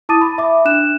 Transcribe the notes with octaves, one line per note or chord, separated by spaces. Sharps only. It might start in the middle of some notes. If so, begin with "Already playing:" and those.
E4 A5 D6 D#6 A6 D#7
B5
E5 D6
D4 F#6 E7